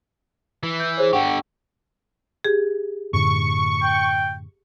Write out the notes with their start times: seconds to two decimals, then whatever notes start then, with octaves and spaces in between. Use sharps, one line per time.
0.63 E3
0.80 G6
0.97 G#4 C5 C#5
1.13 D3 G4 F#5 G5 C#6
2.45 G4 G#4
3.13 F#2 A2 D3 C#6
3.83 G5